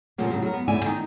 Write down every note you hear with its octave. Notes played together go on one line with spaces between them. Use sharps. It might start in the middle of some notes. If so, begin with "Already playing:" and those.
A#2 C#3 F3 F#3 A#3
A2 C#3 F#3
F#3 A#4
B3
D2 A2 E4 C#5 D5 G#5
D#3 D#4